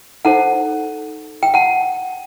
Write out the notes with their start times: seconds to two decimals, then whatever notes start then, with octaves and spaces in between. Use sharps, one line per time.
0.25 D#4 A4 C5 F#5 A5
1.43 G5
1.54 F#5 A5